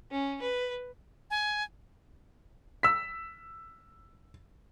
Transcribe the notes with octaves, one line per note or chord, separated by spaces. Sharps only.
C#4
B4
G#5
E6 B6